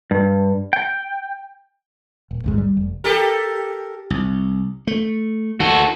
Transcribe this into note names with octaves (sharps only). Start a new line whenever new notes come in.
G2
G5
D#1
A1 D#2 G#2
G3
F1
G4 A4 A#4
C2
A3
D2 D#3 F#4 A4